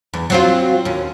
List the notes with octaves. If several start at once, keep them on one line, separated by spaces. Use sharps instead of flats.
E2
F#3 C4 F4
D#2 C#4